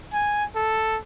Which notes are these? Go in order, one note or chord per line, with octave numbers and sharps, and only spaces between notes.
G#5
A4